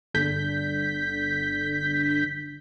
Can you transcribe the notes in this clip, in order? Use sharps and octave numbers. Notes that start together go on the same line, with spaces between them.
G1 D3 G6 B6